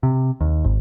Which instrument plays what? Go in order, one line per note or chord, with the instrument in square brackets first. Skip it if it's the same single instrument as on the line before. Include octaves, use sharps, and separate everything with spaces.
[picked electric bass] C3
D#2
G#1